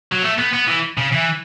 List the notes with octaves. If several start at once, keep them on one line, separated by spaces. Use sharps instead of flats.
F#3
A3
B3
B3
E3
C#3
E3